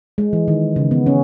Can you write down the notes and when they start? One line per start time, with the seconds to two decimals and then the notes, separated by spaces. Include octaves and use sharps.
0.18 G#3
0.33 E3
0.48 D#3
0.76 C#3
0.91 B3
1.06 C#4